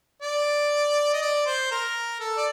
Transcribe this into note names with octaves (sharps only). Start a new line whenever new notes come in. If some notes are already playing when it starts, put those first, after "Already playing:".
D5
D#5
D5
C5
A#4
A4
D5